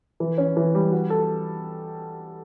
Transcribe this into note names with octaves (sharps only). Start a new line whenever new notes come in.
E3
C#4
E3
G3
F#4
A4